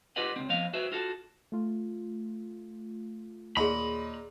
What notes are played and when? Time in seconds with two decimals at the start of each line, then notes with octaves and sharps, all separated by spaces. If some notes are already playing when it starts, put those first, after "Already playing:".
0.16 F4 G4 B4 D#5 F#5
0.36 C#2 C4
0.50 F3 B3 D#5 F5
0.73 F#4 B4 C5 E5
0.92 F4 F#4 A4
1.52 A3 F4
3.57 D#2 A#2 G#4 C#5 D#5 B5 C6